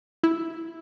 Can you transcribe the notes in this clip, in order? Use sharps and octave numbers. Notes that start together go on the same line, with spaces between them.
E4